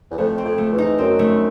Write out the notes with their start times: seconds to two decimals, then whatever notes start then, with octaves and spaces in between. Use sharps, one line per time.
0.11 E2
0.18 F2 A3
0.38 C4
0.44 F2
0.58 A3
0.72 E2
0.78 D#4
0.98 F#2 C4
1.19 A3